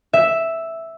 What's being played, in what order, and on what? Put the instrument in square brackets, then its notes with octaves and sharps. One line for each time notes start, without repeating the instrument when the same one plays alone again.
[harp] E5